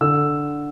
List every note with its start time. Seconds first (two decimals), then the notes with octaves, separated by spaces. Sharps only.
0.01 D3 E6